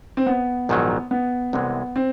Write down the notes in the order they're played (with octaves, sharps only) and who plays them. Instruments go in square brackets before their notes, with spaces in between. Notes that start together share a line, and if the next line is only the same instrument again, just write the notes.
[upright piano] C4
B3
[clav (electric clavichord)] A#1 G#2 D#3 F#3
[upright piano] B3
[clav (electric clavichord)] C2 C3 E3 G#3 [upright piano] B3
[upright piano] C4